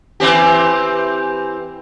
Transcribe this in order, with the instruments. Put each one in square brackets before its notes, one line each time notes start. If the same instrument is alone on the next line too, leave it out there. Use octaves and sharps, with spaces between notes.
[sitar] E3 C4 G4